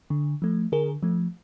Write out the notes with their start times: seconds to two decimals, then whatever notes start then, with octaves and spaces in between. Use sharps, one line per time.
0.10 D3
0.42 F3 A3
0.72 D3 G#4 A#4
1.03 F3 A3